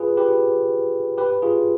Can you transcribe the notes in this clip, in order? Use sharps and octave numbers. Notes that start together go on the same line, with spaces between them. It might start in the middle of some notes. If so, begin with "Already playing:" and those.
Already playing: F4 G#4 B4
G4 B4
G4 B4
F4 G#4